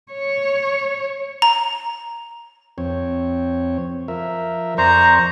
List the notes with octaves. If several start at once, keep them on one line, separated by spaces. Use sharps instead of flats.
C#5
A#5
F2 C4 C#5
F3 A#4 E5
F2 C5 D5 A#5 C#6